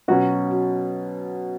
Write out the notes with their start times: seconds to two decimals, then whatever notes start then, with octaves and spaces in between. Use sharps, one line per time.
0.08 B2 F#3 C#4 F#4